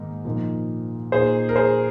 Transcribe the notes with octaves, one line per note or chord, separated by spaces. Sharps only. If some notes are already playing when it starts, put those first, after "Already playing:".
Already playing: G#2 D#3 A#3 D#4
A#2 F3 A#3 D#4
A#2 A#3 D#4 G#4 C5
A#4
G#4 C5